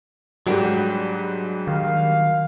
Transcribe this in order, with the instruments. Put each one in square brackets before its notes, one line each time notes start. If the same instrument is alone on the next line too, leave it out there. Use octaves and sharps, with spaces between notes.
[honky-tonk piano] G#2 G3 F#4 [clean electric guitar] F#3 D4 G4
[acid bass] D#3 [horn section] F5